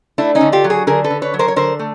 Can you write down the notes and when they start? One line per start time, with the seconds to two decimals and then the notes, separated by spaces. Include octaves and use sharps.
0.18 A3 D4 E4
0.35 C#4 D#4
0.41 D3
0.52 F4 G4
0.64 F#3
0.70 F#4 G#4
0.87 D3 G#4 A#4
1.04 A4 B4
1.10 D3
1.22 B4 C#5
1.34 F#3
1.39 A#4 C5
1.48 C#5
1.56 D3 A#4 C5
1.79 A3